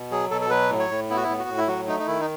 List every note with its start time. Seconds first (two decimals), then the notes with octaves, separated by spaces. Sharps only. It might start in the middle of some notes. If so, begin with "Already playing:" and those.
Already playing: B2
0.12 F#3 G#4
0.31 B2 A4
0.41 A4
0.50 F#3 B4
0.70 A2
0.80 C#5
0.90 A2
1.10 B3 E4
1.17 F#4
1.23 E4
1.29 A2
1.39 F#4
1.48 A2
1.58 E4
1.67 F#3 F#4
1.88 A3 D#4
2.00 D#4
2.07 D#3 E4
2.20 D#4